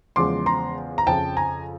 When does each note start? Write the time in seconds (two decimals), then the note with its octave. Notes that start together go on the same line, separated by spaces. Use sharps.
0.16 E2 C#3 F3 G#3 C6 D6
0.46 A#5 C6
0.98 A#5
1.07 F2 C#3 F3 G5 A5
1.37 G#5 A#5